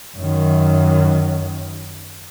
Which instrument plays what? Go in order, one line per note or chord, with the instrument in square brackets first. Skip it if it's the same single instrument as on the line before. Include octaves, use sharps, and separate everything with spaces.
[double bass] F#2 D#3